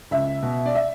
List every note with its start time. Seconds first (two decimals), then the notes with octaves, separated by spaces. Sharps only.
0.11 C#2 E5
0.43 B2
0.66 D5
0.75 E5